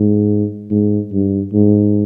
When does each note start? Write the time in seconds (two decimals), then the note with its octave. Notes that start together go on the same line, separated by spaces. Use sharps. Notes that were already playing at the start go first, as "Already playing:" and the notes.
Already playing: G#2
0.71 G#2
1.12 G2
1.53 G#2